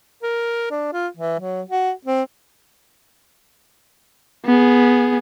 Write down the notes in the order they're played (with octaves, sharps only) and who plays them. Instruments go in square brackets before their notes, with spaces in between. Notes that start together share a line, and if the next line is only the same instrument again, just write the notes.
[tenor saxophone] A#4
D4
F4
E3
F#3
F#4
C4
[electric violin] B3 G#4